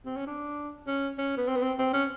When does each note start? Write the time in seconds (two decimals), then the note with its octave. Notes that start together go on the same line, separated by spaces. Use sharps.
0.05 C4
0.17 C#4
0.27 D4
0.87 C#4
1.18 C#4
1.38 B3
1.48 C4
1.56 B3
1.62 C4
1.79 C4
1.93 C#4